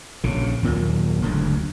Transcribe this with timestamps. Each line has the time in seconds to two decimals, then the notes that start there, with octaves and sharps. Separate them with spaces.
0.24 A#1 C#3
0.63 D#2 A#2 D#3 F#3
1.22 F#1 D2 G#2